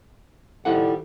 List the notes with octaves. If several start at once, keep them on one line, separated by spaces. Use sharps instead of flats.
D#3 F3 G3 E4 A4 F#5